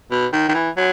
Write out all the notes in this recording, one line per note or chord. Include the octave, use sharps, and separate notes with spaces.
B2
D#3
D#3
E3
F#3